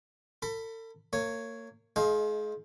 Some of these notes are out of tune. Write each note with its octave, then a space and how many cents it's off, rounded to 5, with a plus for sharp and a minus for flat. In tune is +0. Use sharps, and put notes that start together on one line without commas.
A4 +40 B5 +0
A#3 -30 C#5 +0
G#3 +35 D#4 +20 F5 +0